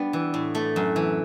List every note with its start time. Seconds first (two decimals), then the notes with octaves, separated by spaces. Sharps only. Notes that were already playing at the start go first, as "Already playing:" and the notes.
Already playing: G3 B3 D4
0.13 E3
0.34 A2
0.55 A3
0.76 F#2
0.96 E3